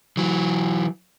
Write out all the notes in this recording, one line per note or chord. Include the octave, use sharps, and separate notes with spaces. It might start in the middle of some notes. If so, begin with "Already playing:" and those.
E3 F#3